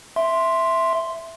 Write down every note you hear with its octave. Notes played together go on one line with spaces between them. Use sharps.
E5 C6